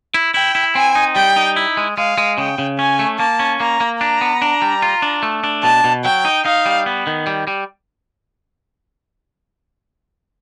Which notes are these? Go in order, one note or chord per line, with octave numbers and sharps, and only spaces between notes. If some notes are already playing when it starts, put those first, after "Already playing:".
E4
E4 G5
E4
C4 G#5
D#4
G3 G5
D#4
E4
G#3
G#3 F5
G#3
C#3 G5
C#3
C#4 G#5
A3
A#3 A5
C#4
A#3 A#5
A#3
D4 A#5
B3
D4
G3
F4
D4
A3
D4
B2 A5
B2
F#3 G5
D#4
D#4 F5
G3
B3
D#3
G3
G3